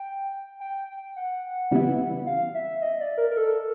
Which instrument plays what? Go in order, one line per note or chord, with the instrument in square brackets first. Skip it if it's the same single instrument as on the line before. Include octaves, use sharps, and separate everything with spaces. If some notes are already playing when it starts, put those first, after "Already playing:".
Already playing: [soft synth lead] G5
G5
F#5
[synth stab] C#3 E3 G3 B3 E4
[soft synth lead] F5
E5
D#5
D5
A#4
A#4
A4